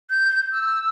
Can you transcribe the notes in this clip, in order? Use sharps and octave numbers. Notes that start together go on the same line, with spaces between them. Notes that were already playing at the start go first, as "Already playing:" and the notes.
G6
E6